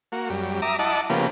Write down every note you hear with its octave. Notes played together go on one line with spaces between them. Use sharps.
A#3 F#4
F#2 G3
E5 A#5 D6 D#6
E4 D#5 F#5 A5 D6
C#3 F3 A#3 B3 G4